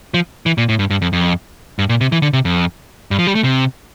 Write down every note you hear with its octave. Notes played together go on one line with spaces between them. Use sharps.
F3
E3
A#2
A2
G2
G2
F2
F2
G2
A#2
C3
E3
D3
C3
F2
G2
F3
G3
A3
C3